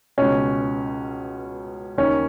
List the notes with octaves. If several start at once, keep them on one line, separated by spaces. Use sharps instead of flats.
C#2 B2 C#4
D#2 D#3 C#4